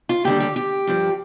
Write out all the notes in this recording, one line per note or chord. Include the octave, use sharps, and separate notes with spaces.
F4
D#2 D3 G3 G4
G4
G4
G2 F3